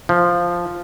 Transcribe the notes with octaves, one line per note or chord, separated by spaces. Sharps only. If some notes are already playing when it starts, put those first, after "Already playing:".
F3